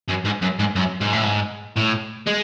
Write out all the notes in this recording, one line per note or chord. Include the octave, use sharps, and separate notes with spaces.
F#2
G#2
F#2
G#2
F#2
G#2
A2
G#2
A2
G#3